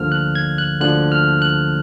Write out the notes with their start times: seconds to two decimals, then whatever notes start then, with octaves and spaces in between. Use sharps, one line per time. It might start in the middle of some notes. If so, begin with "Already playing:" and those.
Already playing: D2 D3 F3 A#3 F6
0.12 F#6
0.35 G#6
0.58 F#6
0.80 D2 D3 F3 A#3 F#6
1.12 F6
1.42 F#6